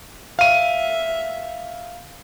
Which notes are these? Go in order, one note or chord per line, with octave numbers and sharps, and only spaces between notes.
E5 F5 D#7